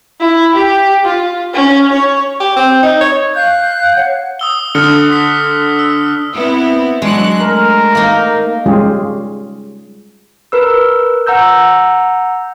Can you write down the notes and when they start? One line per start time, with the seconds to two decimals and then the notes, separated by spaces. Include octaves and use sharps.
0.21 E4
0.55 G4
1.05 F4
1.54 C#4
1.93 C#5
2.40 G4
2.56 C4
2.83 D#4
3.01 C#5
3.36 F5 F#6 G6
3.95 C#5 F#5
4.39 D#6 E6 G7
4.75 D3 D#6 F6 C#7
5.12 B6
5.79 E6
6.33 B3 C4 E4
7.02 F#3 G#3 D4 F#6
7.41 A3 A#4
7.95 A#3 D#4
8.66 G3 G#3 C#4 F4 G4 G#4
10.52 A#4 B4 E6
11.27 F#5 A#5 E6 G6